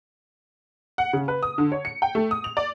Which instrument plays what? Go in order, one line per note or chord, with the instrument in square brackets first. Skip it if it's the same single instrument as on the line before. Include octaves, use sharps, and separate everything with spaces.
[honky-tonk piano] F#5
C#3
B4
D#6
D3
C#5
C#7
G5
A3
D#6
F7
D5